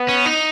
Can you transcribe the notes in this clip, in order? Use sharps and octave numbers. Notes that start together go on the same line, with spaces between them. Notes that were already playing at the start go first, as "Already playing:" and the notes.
Already playing: B3
C#4
D#4